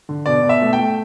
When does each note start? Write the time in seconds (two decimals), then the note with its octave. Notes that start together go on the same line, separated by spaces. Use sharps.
0.09 D3
0.26 B2 D5
0.44 B2
0.49 E5
0.62 A3
0.73 G5
0.79 A3